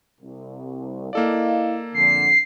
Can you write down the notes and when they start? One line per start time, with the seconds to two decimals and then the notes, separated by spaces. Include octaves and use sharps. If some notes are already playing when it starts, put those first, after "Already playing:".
0.21 C2
1.13 A#3 E4 A4 D5 D#5 F5
1.94 F2 D3 C7